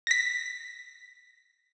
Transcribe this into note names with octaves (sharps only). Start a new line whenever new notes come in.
A#6 B6